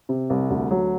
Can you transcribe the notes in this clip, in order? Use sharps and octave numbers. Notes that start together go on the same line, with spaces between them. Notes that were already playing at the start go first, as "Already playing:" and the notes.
C3
C2
D2
F#3